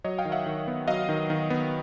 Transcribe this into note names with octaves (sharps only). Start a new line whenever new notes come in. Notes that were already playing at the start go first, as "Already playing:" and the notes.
F#3 C#5 D#5
F5 G5
D#3
E5 F#5
D#3
B3
F#3 D#5 F5
D#3
D#3
B3